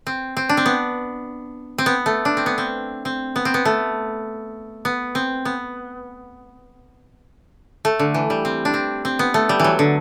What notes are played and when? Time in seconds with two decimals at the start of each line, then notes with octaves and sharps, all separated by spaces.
0.07 C4
0.37 C4
0.49 D4
0.57 C4
0.66 B3
1.78 C4
1.86 B3
2.06 A3
2.25 D4
2.37 C4
2.46 B3
2.58 C4
3.05 C4
3.36 B3
3.45 C4
3.54 B3
3.65 A3
4.85 B3
5.15 C4
5.45 B3
7.85 A3
7.99 D3
8.14 E3
8.30 G3
8.45 C4
8.65 D4
8.74 C4
9.05 C4
9.19 B3
9.34 A3
9.49 G3
9.59 E3 F#3
9.79 D3